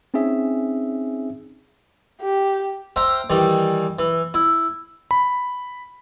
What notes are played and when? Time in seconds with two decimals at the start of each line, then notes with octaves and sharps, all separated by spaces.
0.14 C4 C#4 D#4 G#4 E5
2.22 G4
2.96 C5 E5 F5 G5 A#5
3.30 D#3 E3 G3
3.99 E3
4.34 E4
5.11 B5